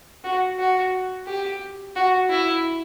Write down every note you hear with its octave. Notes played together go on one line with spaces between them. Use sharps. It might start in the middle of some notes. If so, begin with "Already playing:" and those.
F#4
F#4
G4
F#4
E4